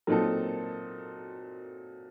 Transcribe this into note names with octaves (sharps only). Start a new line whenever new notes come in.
A#2 F#3 C4 D#4 A4